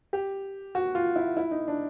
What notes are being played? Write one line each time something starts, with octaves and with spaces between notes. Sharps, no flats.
G4
F#4
F4
E4
E4
D#4
D4